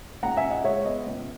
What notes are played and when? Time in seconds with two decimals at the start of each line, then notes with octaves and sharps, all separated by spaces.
0.23 C#2 F#5 A#5
0.37 E5 G#5
0.44 C#2
0.51 D#5 F#5
0.64 G#3 C#5 E5
0.85 B3 D#5
1.06 C#2